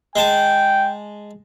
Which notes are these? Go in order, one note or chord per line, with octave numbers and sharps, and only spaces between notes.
G#3 G5 A5